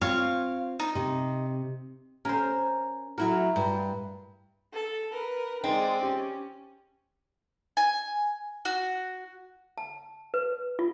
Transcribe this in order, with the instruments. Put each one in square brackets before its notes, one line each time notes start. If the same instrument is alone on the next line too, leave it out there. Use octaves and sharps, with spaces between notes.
[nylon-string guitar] C4 F4 [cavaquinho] C#5 F5
[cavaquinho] D#4
[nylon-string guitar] C3
[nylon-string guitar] C#4 [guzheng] A#4 C5
[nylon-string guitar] F#3 E4 F#4 [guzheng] A#4
[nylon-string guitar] G2
[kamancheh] A4
A#4 B4
[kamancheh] G#3 D5 [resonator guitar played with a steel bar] C4 [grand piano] D#4
[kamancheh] C#4 [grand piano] G4
[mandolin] G#5
F#4
[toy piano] A5
B4
F4